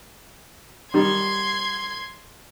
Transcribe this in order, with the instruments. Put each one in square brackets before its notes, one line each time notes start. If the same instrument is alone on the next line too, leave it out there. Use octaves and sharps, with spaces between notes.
[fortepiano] D#3 G3 [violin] C6 G#6